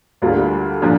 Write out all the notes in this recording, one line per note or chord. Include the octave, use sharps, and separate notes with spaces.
D2 D3 G3 A#3 F4
A#2 F3 D4